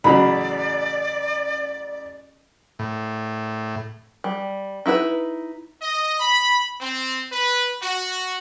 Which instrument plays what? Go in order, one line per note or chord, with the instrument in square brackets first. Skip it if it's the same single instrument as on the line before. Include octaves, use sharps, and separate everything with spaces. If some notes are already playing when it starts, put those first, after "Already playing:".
[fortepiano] A1 C#3 F#3 [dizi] D5 [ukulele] B5
[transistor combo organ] A2
[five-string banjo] G3
D#4 E4 F#4 B4
[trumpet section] D#5
B5
C4
B4
F#4